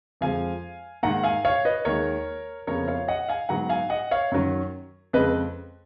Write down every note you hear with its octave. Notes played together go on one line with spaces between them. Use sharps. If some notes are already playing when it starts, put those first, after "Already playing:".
F2 F3 G#3 F5 G#5
G#2 D#3 A#3 F#5 A#5
F5 G#5
C#5 F5
B4 D#5
D#2 D#3 G#3 A#4 C#5
F2 C#3 F3 B3 A#4 C#5
C#5 F5
D#5 F#5
F5 G#5
G#2 F#3 B3 F#5 A#5
F5 G#5
D#5 F#5
C#5 F5
F#2 D#3 F#3 C#4
F2 C#3 G#3 B4 D#5